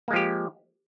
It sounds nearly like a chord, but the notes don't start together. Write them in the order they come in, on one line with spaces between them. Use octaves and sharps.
A#3 G#3 F3 G4